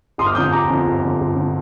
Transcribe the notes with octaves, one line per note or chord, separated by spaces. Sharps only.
G1 C6 D#6
D6 F6
F2 D3 D#6 G6
G1 A#5 D6
F2 D3
G1
F2 D3
G1
D3